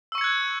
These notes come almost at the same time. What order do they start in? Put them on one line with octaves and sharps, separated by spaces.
E6 C#6 C#7 G#6 F#6